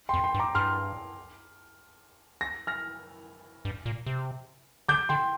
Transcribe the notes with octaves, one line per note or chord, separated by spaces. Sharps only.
G5 C6
F2
G5 C6
G2
A#5 D6
G2 C6 F6
A#6
F6 A#6
G2
A#2
C3
D3 D6 G6
D3 G5 C6